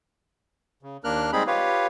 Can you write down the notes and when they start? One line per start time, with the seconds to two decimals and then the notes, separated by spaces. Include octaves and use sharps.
0.83 C#3
1.04 D#2 A#3 D4 A#4 F6 F#6
1.33 G3 G#3 C4 D#4 G#4 B5
1.47 F4 G4 B4 C#5 F5